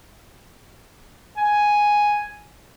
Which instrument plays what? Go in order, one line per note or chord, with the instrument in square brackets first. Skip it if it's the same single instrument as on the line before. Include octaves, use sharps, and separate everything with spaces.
[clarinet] G#5